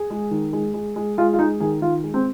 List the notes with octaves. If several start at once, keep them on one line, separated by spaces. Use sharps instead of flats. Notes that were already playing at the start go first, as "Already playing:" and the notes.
Already playing: G#4
G#3
D#3
G#3
G#3
G#3
G#3 F4
F4
G#3 D#4
D#3 G#4
D#3 F4
G#3
C4